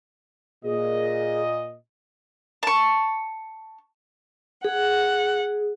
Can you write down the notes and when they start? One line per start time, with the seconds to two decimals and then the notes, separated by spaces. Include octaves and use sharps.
0.64 A#2 G#4 D#5
2.63 A5 C#6
4.65 G#4 F#5